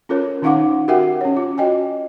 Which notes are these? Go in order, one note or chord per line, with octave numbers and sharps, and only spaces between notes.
C#4 F4 A4 A#4 C#5
D#3 C#4 D#4 F5 F#5 D6
F#4 G4 A#4 E5 F#5 G5
C#4 C#5
F4
F#4 D#5 G5 G#5